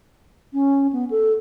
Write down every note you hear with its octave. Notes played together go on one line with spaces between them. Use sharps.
C#4
B3
A4